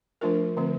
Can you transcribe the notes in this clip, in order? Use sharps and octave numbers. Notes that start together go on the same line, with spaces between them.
F3 A3 D4 F4 A#4
D3 F3 A3 C4